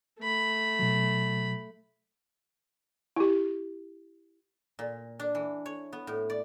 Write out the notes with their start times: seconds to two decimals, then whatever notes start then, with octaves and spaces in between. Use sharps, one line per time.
0.19 A3 B5
0.79 B2 F#3
3.16 E4 G4
4.79 A#2
5.20 D4
5.35 E3
5.66 C#5
5.93 B3
6.07 A2
6.30 D5